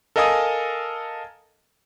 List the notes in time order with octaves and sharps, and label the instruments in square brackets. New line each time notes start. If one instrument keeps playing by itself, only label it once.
[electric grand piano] A4 A#4 D#5 F5 G#5 D#6